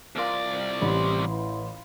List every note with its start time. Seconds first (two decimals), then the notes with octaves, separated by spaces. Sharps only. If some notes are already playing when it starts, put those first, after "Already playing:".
0.16 C2 F4 A#4 D5 A#5
0.82 A1 G4 B5 C6
1.27 E3